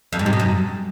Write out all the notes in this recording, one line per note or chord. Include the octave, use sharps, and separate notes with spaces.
F2
G#2
C3
B2
F#2